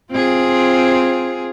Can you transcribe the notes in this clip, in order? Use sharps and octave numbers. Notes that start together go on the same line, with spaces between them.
C4 F4 G#4